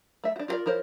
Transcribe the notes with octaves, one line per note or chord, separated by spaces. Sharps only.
A3 E5
D4 F#4
F4 F#4 G#4 A#4 D5
F3 E4 A#4 C5 C#5